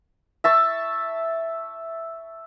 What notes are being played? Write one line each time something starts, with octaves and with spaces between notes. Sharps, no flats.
E5 A5 C#6